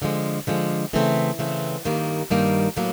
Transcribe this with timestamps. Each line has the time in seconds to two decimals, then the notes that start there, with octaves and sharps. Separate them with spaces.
0.02 D3 F3 G#3
0.47 D3 F3 G#3
0.93 C#3 E3 A3 C4
1.39 C#3 E3 A3 C4
1.85 G2 D#3 G3 A#3
2.30 G2 D#3 G3 A#3
2.77 A2 F#3 A#3